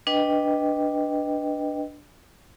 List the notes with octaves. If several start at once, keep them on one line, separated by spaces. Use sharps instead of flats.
D4 B4 D#5 G5